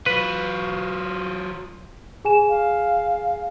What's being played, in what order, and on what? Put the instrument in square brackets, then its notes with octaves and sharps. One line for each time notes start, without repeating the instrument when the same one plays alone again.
[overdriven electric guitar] F#3 F4 [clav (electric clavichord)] B4
[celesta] G#4 G#5 E7
[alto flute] F5